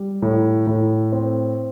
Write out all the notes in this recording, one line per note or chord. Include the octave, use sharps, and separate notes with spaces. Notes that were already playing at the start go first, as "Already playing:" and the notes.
Already playing: G3
A2
A2
C4